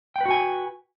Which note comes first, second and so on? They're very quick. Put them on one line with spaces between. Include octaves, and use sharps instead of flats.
G5 B4 F#4 G#5